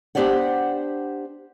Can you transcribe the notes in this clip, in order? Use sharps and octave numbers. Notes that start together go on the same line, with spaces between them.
B3 D4 G4 C5 D5 F#5